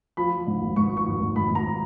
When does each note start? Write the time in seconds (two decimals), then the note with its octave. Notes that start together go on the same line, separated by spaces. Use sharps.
0.17 F3 B5
0.32 F3
0.47 G#2
0.62 G#1
0.76 G#2 C#6
0.92 F3
0.97 C#6
1.07 G#1
1.21 G#1
1.36 G#1 B5
1.50 G#1 A#5